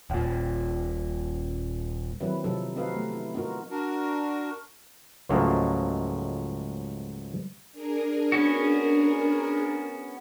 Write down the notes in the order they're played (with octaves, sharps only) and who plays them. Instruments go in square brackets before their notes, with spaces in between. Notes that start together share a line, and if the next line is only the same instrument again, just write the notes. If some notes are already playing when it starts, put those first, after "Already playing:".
[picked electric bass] D#1 A#2
[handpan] D#3 F#3 A#3 C4 E4 B4
C3 F3 F#3 D#4 A4
C4 D#4 F#4 A4 B4 F5
A3 B3
E4
B3 D#4 F4 F#4 A#4
[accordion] D4 F#4 A#4
[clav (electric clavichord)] C#2 G#2 F3 F#3 A3 A#3
[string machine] D4 G#4 A#4
[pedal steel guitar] B3 C#4 F#4